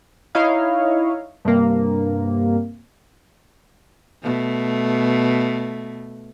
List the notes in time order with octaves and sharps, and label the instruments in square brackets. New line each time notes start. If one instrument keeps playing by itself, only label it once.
[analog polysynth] D#4 E4 C#5 D#5 F5
G2 C3 A#3
[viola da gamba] B2 A3